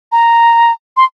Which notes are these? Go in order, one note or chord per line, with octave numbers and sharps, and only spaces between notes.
A#5
C6